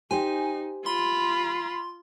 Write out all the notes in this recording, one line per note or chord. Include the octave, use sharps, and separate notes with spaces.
D#4 G4 C5 G#5
F4 B5 C6